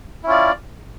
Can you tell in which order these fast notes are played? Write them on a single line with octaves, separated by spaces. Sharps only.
E4 C#4 F4 D5